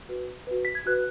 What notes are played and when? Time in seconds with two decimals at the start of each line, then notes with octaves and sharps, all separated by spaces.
0.09 F#4 B4
0.47 F#4 B4
0.65 B6
0.75 G#6
0.86 F#4 B4 F#6